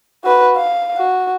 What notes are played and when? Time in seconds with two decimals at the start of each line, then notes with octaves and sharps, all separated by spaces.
0.24 F#4 B4
0.56 F5
0.97 F#4